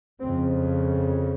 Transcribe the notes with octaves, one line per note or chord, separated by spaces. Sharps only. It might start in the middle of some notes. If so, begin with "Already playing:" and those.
F2 C#3 C4